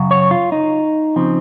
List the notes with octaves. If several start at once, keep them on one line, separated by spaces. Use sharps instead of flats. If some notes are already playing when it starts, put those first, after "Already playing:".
Already playing: F#2 C#3 F#3
C#5
F4
D#4
C#3 F3 C4